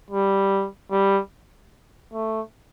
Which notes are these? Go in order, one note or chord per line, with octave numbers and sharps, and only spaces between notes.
G3
G3
A3